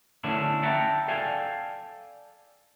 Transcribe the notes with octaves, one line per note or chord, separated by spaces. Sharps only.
D3 A3 B3 C#4 D4 E4
E5 F#5 G5 A5 A#5
A4 D5 F5 G5 G#5